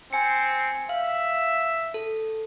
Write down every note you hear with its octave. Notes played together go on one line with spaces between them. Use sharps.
C4 G#5 C#7
E5 F5
A4